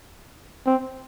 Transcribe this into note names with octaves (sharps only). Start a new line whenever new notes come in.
C4